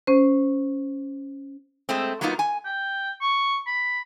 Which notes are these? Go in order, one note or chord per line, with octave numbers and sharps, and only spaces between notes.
C#4 C5
G#3 A3 C4
F#3 A#3 B3 D#4 F4
G#5
G5
C#6
B5